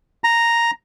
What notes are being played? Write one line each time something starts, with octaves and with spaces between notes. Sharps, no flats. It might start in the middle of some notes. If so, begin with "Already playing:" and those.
A#5